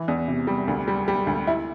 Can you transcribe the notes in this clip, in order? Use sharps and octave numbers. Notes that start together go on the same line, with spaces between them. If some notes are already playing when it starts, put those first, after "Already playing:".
Already playing: E3
E2
C3
G3
D2
G3
G3
D2
E4